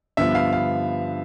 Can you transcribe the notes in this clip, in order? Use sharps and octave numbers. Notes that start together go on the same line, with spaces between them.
G2 D3 F3 B3 F4 E5
F5
F5